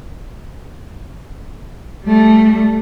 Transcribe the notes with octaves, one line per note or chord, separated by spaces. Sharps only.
G3 A3